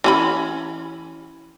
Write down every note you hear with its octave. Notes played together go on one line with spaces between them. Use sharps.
E3 C#4 B5